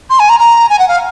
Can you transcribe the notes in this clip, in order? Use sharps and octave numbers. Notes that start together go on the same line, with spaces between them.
C6
G#5
A#5
A#5
G#5
F#5
F5